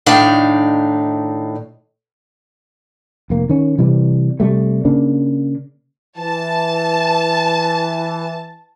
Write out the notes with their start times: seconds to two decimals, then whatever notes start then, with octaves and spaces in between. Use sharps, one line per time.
0.06 A2 D#3 D4 D#4 F5
3.30 F1 A#3
3.49 D#3 C#4
3.78 C3 E3 G3
4.40 C3 G3 A3
4.85 C#3 A#3 D4
6.18 E3 A5